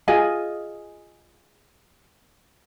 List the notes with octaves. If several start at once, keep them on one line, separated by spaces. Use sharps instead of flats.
F4 G#4 D#5 G#5